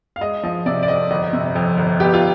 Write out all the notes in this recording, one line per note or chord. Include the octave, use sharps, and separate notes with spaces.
F5
G#3 D#5
F3 D#5
C3 D5
D5
F2 D#5
G1 D#5
C3
F2
G1
B3 G4
F4